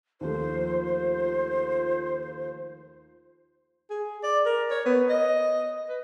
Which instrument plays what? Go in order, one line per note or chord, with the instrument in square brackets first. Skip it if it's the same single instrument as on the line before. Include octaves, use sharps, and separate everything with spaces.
[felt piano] D#2 F3 A3 [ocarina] F4 [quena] C5
[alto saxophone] G#4
D5
A#4
C#5
B3
D#5
B4